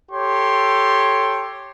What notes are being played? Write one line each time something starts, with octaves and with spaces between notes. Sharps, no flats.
G4 A4 C#5 C6